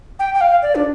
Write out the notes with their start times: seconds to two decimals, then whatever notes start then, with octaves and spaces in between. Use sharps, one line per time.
0.19 G5
0.35 G5
0.41 F5
0.62 D5
0.75 D4